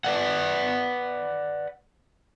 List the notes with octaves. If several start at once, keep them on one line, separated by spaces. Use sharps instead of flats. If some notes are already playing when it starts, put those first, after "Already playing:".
B4 D5 F#5